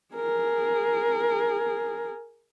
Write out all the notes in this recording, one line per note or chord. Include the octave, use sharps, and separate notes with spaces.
G#4 A#4